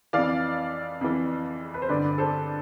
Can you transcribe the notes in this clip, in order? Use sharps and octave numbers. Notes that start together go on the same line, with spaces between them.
F2 E3 D5 F5
F2 E3
B4
C5
G2 D3 B4 D5
A4 C5